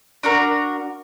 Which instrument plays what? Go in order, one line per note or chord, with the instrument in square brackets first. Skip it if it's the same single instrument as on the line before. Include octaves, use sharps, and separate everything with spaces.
[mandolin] D4 F#4 A#4